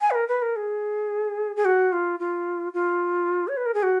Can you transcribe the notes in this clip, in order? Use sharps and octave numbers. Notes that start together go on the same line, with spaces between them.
G#5
B4
A#4
B4
A#4
G#4
G#4
F#4
F4
F4
F4
C#5
B4
A#4
G#4
F#4